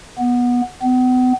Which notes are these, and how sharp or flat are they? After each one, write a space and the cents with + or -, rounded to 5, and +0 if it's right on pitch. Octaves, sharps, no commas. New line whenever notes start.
B3 -15
B3 +40